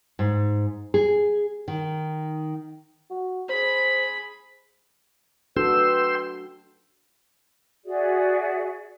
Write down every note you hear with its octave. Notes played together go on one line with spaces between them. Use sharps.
G#2
G#4
D#3
F#4
G#4 C5 B5
D4 F#4 A4 B4 G5 C6 E6
F#4 G#4 D5 E5